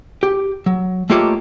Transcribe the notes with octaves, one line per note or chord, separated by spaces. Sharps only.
G4
F#3
A3 A#3 F4 G4 C#5 D#5